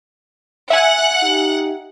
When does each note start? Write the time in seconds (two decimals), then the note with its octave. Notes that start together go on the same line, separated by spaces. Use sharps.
0.70 E5 F#5 G#5 F#6
1.23 D#4 G4